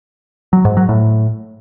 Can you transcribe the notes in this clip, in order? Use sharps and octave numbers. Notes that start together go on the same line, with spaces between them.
F#3
G#2
F#3
A2